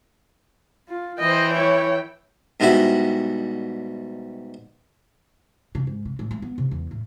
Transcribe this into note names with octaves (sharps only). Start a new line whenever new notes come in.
F4
E3 C5 D#5 G5
E4 C#5
G#2 B2 G3 E4 F#4
C3
G#2
C3
A2
A3
B3
C3
E2
A2